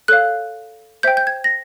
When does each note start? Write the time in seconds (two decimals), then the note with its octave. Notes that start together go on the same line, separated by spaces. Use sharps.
0.08 A4 C#5 F5 F#6
1.03 C5 E5 G5 G6
1.17 G6
1.27 G#6
1.44 A#6